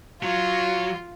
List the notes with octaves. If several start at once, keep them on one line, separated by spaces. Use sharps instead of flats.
F#3 F4